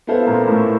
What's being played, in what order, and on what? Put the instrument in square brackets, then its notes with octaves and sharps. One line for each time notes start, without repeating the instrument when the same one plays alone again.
[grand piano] B3 E4 A4 C5 F5
[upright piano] A#2 A#3
A2 A3